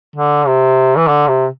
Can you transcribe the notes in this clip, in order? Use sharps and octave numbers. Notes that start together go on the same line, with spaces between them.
D3
C3
E3
D3
C3